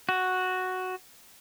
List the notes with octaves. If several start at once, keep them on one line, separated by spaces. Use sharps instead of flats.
F#4